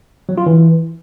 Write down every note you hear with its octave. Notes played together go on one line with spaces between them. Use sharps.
F#3
F4
E3